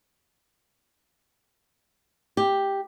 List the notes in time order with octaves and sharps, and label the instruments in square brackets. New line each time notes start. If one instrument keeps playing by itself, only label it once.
[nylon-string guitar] G4